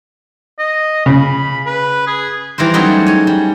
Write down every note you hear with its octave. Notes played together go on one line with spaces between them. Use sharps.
D#5
C#3 B5
B4
G#4
E3 G3 A#4 C5
F#3 G3 A3 C#4 D#4 G#4
C#5 G#5
G3